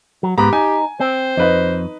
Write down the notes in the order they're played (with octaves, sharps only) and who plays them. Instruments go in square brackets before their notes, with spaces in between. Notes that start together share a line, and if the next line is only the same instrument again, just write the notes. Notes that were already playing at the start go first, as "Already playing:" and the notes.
[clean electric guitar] F#3
[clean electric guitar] G#2 B3 [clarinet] G4 [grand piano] A#5 B5
[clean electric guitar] D#4 [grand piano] G#5
[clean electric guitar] C4 [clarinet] C5
[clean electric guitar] F2 [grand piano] D#4 B4 D#5